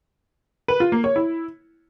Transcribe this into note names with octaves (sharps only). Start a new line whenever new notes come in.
B4
F4
A#3
C#5
E4